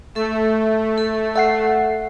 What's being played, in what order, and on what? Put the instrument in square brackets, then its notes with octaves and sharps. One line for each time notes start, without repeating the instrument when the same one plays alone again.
[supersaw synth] A3 [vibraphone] A4 E5
[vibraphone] A4
[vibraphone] A4 [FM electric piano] E5 F#5 C7